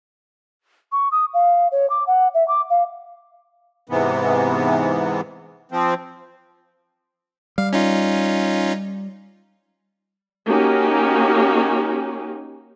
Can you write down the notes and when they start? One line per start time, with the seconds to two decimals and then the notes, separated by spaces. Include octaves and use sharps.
0.92 C#6
1.12 D#6
1.34 F5
1.72 C#5
1.90 D6
2.07 F#5
2.34 E5
2.48 D6
2.70 F5
3.89 G#2 C3 E3 B3
5.71 F3 C4
7.58 G3 F5
7.73 C#4 D#4 F4
10.48 A#3 C#4 D#4 F#4 G4